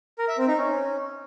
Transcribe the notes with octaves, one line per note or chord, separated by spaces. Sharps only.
A#4
E5
C4
D#4
C#4